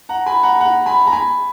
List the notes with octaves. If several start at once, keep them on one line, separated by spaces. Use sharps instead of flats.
F#5 A#5
G#5 B5
F#5 A#5
F#5 A#5
G#5 B5
A#5
G#5 B5